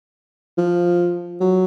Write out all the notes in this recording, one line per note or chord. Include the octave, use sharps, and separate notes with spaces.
F3
F#3